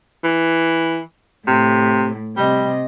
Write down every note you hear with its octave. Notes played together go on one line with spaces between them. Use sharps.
E3
A2 C3
C3 G3 D#5